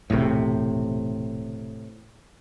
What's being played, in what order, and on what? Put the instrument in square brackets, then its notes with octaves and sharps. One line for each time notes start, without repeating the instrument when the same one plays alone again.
[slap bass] E1 D#2 [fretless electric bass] A2 C3